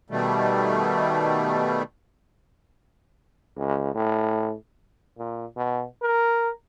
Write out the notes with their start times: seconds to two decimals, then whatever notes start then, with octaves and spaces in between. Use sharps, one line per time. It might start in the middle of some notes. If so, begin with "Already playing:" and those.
0.10 B2 D#3 G3 A3
3.57 C#2
3.95 A2
5.18 A#2
5.57 B2
6.02 A#4